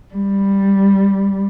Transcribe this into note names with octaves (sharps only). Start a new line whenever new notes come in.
G3